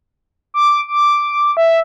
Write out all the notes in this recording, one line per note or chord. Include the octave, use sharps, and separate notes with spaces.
D6
D6
E5